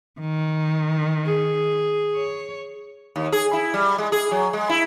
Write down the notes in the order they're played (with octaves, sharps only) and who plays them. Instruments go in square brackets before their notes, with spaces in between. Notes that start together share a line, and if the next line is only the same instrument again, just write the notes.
[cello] D#3
[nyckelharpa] G#4
[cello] C#5
[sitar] D#2
G#4
E4
G3
G#3
G#4
F#3
G#3
E4